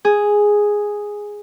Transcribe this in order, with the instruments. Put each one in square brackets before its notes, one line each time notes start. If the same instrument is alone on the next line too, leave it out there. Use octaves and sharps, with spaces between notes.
[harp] G#4